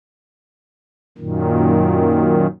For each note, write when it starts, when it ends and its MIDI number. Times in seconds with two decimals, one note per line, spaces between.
1.18 2.47 42
1.18 2.47 46
1.18 2.47 51